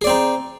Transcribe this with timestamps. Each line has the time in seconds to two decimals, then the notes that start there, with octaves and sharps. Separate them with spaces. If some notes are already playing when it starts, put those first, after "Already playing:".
0.02 G#4
0.04 D5
0.07 C4
0.10 D#4